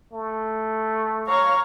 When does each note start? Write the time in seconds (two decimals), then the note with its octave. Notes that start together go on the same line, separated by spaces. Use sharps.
0.13 A3
1.27 C#5 F5 A#5 C#6